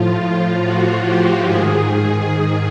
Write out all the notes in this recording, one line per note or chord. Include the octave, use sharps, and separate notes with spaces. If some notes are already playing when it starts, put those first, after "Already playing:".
Already playing: A2 F3 F4
F4
F#4
G4
G#2 D#3 G#4